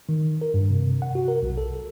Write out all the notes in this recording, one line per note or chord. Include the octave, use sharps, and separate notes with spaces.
D#3
A#4
G2
C3
F#5
F#4
A#4
B1
A4